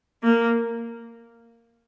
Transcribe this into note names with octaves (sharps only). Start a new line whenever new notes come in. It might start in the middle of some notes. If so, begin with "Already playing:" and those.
A#3